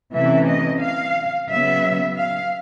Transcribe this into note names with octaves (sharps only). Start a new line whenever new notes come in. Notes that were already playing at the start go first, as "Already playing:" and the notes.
C3 E3 A3 C#4 E5
D#5
F5
C#3 F#3 B3 E5
F5